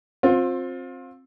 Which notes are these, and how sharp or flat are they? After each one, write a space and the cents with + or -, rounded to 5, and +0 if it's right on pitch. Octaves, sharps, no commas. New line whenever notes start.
C4 +15 F4 +30